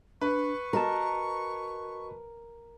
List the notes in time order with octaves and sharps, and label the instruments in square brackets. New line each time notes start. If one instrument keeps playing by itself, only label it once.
[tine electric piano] D4 [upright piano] B4 [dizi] C#6
[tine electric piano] F#4 D#5 A5 [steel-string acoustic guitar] A#4